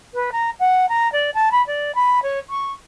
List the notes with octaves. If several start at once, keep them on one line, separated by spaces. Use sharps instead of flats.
B4
A#5
F#5
A#5
D5
A5
B5
D5
B5
C#5
C#6